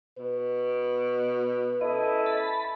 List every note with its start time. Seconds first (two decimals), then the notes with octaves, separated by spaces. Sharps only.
0.18 B2 B4
1.81 C#4 E4 A4 D#5
2.26 A5 B5